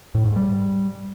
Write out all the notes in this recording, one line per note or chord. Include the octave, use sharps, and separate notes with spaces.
A2
G#2
G3